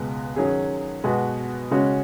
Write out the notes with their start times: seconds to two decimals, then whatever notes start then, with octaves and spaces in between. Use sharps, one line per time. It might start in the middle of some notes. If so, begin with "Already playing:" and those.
Already playing: C#2 B2 G#3 B3
0.36 D#3 F#3 C#4 G#4
1.04 B2 G#3 B3 F#4
1.71 C#3 G#3 C#4 F#4